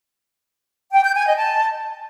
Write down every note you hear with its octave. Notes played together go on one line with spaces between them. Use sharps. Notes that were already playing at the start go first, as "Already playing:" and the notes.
G5
G6
G#5
D#5
A5